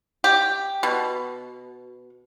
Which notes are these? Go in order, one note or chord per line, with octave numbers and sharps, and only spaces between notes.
G4
B2